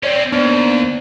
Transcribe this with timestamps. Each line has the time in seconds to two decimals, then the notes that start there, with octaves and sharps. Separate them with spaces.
0.03 C4 C#4 C#5 D5
0.33 D#2 B3 D4 C5